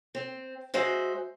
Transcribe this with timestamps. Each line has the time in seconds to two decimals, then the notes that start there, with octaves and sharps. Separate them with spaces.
0.15 C4
0.74 G#3 F#4 C5 E5